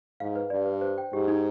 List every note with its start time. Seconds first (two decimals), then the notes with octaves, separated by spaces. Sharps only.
0.20 G#2 F5
0.36 B4
0.50 G2 D5
0.66 B4
0.81 C5
0.98 G5
1.13 G#2 G4
1.28 D#4